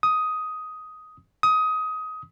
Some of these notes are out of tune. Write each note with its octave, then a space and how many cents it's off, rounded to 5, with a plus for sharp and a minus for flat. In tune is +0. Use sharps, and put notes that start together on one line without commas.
D#6 +10
D#6 +20